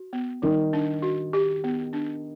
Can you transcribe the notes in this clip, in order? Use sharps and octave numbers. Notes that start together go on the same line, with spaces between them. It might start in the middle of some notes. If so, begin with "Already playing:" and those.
Already playing: F#4
B3
D#3 G3
D4
F#4
G4
B3
D4